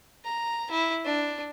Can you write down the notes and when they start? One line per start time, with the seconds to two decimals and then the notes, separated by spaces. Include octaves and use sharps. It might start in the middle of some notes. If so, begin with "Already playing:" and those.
0.24 A#5
0.71 E4
1.05 D4